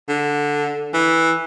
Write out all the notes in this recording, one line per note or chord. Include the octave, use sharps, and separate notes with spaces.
D3
E3